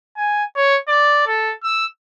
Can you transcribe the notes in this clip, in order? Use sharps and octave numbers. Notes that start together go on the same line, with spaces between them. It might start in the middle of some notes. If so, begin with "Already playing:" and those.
G#5
C#5
D5
A4
E6